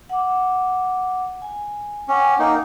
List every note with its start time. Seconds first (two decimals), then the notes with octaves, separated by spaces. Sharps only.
0.09 F#5 D6
1.42 G#5
2.08 C#4 F#5 G5 D6
2.39 A#3 D#4